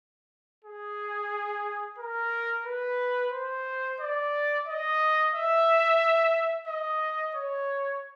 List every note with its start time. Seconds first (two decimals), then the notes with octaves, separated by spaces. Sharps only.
0.65 G#4
1.98 A#4
2.66 B4
3.32 C5
4.00 D5
4.67 D#5
5.34 E5
6.68 D#5
7.35 C#5